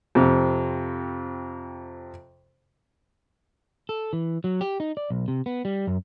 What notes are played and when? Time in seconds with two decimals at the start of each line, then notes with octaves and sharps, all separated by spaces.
0.15 F2 C3
3.89 A4
4.13 E3
4.44 F#3
4.61 G4
4.80 D#4
4.97 D5
5.10 B1
5.28 C3
5.46 B3
5.65 G3
5.87 F#2